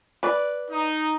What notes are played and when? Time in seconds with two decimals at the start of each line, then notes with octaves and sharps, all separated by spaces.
0.23 B4 D5
0.70 D#4